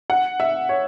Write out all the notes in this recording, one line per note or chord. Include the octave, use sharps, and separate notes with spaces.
F#5
E5
C#5